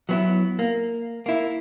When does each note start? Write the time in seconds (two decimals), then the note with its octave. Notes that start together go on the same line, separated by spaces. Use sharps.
0.09 F#3 B3 E4
0.59 A#3
1.26 A#3 E4